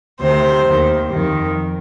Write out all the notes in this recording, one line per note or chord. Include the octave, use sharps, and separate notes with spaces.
D2 C3 D#3 C5
D#2 D#3
F2 D#3